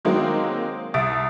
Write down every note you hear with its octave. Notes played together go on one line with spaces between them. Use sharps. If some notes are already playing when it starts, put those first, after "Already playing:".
D#3 F#3 G#3 A#3 C4 D#4
C2 E5 D#6 A6 D7